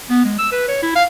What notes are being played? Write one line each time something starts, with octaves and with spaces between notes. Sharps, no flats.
B3
G#3
E6
B4
C#5
E4
F5